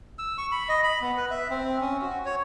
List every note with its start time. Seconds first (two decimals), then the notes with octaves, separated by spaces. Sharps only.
0.19 E6
0.38 C#6
0.51 B5
0.69 D#5
0.84 B5
1.01 B3
1.17 B4
1.30 E5
1.50 C4
1.80 C#4
2.02 F#4
2.25 C#5